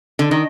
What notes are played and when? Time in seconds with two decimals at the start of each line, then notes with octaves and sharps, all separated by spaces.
0.19 D3
0.31 D#3